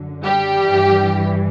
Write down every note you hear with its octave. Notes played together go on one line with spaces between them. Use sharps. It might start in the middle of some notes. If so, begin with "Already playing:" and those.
Already playing: F#2 D3
G3 G4
G2 E3